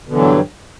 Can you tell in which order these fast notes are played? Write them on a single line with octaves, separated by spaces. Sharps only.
B2 D3 E3 F#3 G2